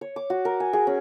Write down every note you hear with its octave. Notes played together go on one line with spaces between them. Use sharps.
C#5
D6
F#4
A#4
G#5
G#4
C#4